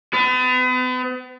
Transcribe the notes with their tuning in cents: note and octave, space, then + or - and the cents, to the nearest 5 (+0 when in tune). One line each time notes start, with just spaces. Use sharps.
B3 +40